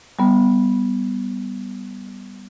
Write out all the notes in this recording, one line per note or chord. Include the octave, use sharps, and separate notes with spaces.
G3 B3